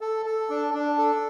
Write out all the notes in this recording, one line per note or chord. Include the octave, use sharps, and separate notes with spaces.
A4
A4
D4
D4
A4